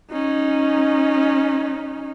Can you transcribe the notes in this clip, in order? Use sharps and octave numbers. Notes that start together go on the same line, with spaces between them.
C#4 D#4